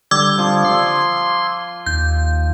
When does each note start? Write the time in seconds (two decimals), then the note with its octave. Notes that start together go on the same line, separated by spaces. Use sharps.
0.11 D3 G3 D6 E6 G#6
0.38 F3 F4
0.65 C6
1.86 D#2 G6